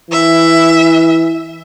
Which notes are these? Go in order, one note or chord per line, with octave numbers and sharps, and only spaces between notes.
E3 E5